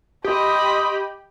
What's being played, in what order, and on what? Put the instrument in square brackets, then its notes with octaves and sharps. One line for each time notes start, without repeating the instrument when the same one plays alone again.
[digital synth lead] G4 [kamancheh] D#5 B5 [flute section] C6 D#6 E6